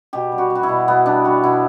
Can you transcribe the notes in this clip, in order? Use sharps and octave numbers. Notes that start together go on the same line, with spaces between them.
B2 G4
G3
F#4
G3
F#4
E4
B2
B2 B3
G3 D4
G3 F#4
B2 E4